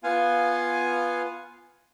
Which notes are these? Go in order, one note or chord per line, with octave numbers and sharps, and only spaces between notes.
B3 F4 F5 F#5 G#5